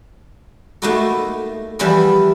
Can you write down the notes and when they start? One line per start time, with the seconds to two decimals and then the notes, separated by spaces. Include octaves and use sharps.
0.82 A3 A#3 D#4 E4 F#4 A4
1.79 E3 F3 G3 B3 E4 G#4